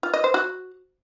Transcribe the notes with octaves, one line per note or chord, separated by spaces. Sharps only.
F4
D#5
C5
F#4